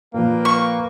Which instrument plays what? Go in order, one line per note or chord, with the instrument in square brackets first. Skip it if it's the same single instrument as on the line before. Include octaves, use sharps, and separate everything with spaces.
[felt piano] A#2 F3 [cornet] A#3 [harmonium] B4 F5 G5
[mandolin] C#6